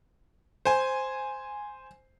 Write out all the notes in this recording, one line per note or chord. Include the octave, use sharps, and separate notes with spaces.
C5 G#5